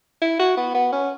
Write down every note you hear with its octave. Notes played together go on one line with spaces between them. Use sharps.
E4
F#4
B3
B3
C#4